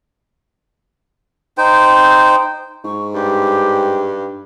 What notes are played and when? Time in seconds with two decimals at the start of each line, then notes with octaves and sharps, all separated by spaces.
1.58 D#4 C5 G5
2.84 G#2 C#6
3.14 G2 G4